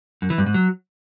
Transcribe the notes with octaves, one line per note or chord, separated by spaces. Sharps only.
F#2
E3
G2
G#2
F#3